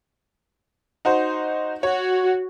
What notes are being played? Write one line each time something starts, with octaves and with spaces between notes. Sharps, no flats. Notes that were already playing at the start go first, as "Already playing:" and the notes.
D#4 F#4 C5
F#4 C#5